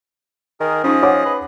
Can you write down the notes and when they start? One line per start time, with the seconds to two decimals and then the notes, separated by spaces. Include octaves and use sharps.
0.60 D#3 G#4 A#4
0.84 F3 C#4 D#4 G#4 D#5
1.02 C#5 F#5 D6
1.25 B4